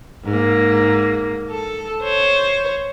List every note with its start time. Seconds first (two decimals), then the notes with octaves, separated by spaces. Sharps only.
0.25 G#2 A#3
1.50 A4
2.03 C5 C#5